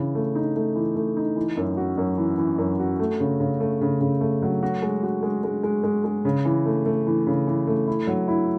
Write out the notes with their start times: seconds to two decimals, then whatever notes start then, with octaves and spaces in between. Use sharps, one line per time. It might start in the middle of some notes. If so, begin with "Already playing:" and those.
Already playing: C#3 E3
0.15 A3
0.35 D#4
0.56 A3
0.75 E3
0.95 A3
1.17 D#4
1.36 E3
1.57 F#2
1.77 F#4
1.98 F#2
2.17 E3
2.38 E3
2.58 F#2
2.80 F#4
2.99 A3
3.20 C#3
3.40 C#3
3.60 A3
3.81 C#3
4.01 C#3
4.21 A3
4.42 F#3
4.63 F#4
4.82 G#3
5.03 F#4
5.23 G#3
5.44 G#3
5.63 G#3
5.84 G#3
6.04 G#3
6.25 C#3
6.45 E3
6.66 A3
6.86 A3
7.07 E3
7.27 C#3
7.47 E3
7.67 A3
7.87 E4
8.07 F#3
8.28 E4